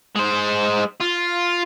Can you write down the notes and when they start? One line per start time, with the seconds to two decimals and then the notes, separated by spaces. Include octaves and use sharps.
0.15 G#3 C5
1.01 F4